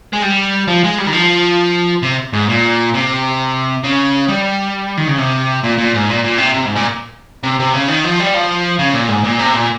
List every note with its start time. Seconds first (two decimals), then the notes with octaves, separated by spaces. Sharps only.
0.13 G#3
0.23 G3
0.68 F3
0.84 G#3
0.98 G3
1.06 D#3
1.13 F3
2.03 C3
2.33 G#2
2.49 A#2
2.94 C3
3.84 C#3
4.28 G3
4.98 D#3
5.08 C#3
5.18 C3
5.64 A#2
5.78 A#2
5.94 G#2
6.09 A#2
6.24 A#2
6.38 C3
6.54 C3
6.66 G#2
6.76 A#2
7.43 C3
7.59 C3
7.74 C#3
7.88 D#3
8.04 F3
8.19 G3
8.34 F3
8.79 C#3
8.94 A#2
9.09 G#2
9.24 A#2
9.39 C3
9.54 A#2